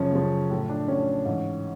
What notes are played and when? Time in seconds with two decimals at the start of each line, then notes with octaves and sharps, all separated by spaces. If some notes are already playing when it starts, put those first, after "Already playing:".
Already playing: F#2 C#3 F3 C#4
0.13 F#2 C#3 F3
0.50 A2 F3
0.69 D4
0.88 A2 F3 C#4
1.25 G#2 E3